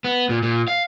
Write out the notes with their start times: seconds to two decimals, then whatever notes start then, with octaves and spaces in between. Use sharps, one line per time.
0.04 B3
0.29 A#2
0.43 A#2
0.68 F5